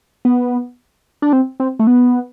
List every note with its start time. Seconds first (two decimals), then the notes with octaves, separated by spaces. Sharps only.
0.25 B3
1.22 D4
1.33 C4
1.60 C4
1.79 A3
1.87 B3